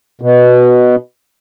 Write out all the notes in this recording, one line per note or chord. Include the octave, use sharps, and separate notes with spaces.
B2